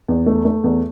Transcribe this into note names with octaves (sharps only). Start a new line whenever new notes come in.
E2
A3
A3
E2